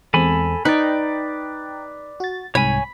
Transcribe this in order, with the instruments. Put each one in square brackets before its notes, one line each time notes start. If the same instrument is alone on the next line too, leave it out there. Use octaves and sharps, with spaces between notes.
[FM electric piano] E2 G#3 C4 [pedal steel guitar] A4 G#5 B5
[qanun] D#4 [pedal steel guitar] B4 D5 [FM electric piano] G5 A#5
[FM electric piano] F#4 A6
[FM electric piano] C2 G#2 [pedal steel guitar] C#5 G#5 [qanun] B5